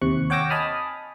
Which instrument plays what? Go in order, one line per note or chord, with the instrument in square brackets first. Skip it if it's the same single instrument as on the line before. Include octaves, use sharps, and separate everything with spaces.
[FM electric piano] D#2 C3 C#6 F#6
C#5 F#5 G5 D6 E6 A#6
D#5 G#5 A5 B5 D#6 F6